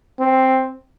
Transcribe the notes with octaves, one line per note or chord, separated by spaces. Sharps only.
C4